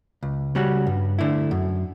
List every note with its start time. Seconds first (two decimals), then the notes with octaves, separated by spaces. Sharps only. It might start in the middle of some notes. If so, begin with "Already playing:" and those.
0.23 C#2
0.55 C#3 G3 C#4 F#4
0.86 G2
1.19 D3 A3 E4
1.51 F#2